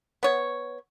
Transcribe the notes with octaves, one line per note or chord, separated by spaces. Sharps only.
B3 C#5